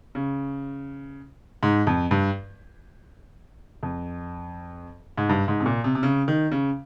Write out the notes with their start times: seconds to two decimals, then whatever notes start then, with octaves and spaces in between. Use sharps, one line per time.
0.15 C#3
1.63 G#2
1.87 F2
2.11 G2
3.83 F2
5.18 G#2
5.29 G2
5.48 G#2
5.60 C3
5.66 A#2
5.84 C3
5.95 C3
6.03 C#3
6.28 D#3
6.52 C#3